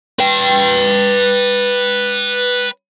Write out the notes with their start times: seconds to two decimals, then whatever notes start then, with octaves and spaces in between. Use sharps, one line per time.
0.19 B4 G5